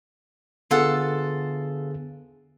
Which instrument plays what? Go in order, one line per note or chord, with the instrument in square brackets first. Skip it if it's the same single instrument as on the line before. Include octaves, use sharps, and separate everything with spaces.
[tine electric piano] D3 B3 G#4 [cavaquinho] F4 A4 F#5